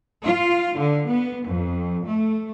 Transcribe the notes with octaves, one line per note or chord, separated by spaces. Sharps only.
F4
D3
B3
F2
A3